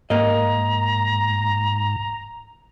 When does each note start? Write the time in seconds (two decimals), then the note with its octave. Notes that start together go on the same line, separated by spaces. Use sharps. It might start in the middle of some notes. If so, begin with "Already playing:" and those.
0.10 G#2 A#3 A#4 D#5 A#5